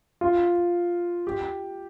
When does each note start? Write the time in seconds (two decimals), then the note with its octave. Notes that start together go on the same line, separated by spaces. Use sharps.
0.21 F4
1.27 G4